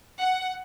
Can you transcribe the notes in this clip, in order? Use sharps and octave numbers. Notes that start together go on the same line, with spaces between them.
F#5